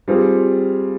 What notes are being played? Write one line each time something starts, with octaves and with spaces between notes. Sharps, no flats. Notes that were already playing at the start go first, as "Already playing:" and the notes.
G3 C4 F4 G#4